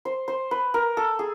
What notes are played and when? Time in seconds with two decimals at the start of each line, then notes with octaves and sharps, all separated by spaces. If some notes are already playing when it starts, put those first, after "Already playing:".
0.05 C5
0.28 C5
0.51 B4
0.74 A#4
0.97 A4
1.19 G#4